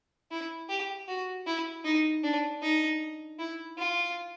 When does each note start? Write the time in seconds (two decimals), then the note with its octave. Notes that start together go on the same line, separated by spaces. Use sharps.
0.31 E4
0.69 G4
1.08 F#4
1.46 E4
1.84 D#4
2.23 D4
2.62 D#4
3.39 E4
3.78 F4